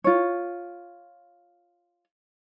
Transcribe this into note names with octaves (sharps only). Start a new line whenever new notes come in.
F4 C#5